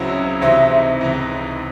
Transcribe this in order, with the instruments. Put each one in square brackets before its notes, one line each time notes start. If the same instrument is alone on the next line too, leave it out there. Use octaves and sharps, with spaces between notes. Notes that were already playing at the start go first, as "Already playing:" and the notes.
Already playing: [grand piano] C#2 C#3 F#3 C4 E4
[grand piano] C#2 C3 E3 C4 D#4 [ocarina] E5
[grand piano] C#2 C3 E3 C4 D#4